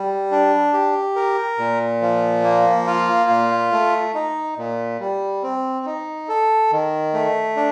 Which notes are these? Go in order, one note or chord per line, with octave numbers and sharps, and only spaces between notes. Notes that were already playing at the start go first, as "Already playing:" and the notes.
Already playing: G3
D4
G4
A#4
A#2
F3
A#3
F4
A#2
A3
D#4
A#2
G3
C4
D#4
A4
D#3
A3
D4